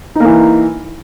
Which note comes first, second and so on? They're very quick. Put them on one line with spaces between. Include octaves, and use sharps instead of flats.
D#4 A#3 E3